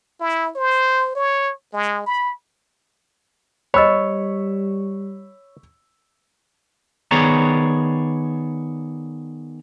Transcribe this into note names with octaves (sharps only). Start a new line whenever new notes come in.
E4
C5
C#5
G#3
B5
G3 C5 C#5 D#5 B5 C#6 E6
D#3 B3 G#4 C#5 D5 A#5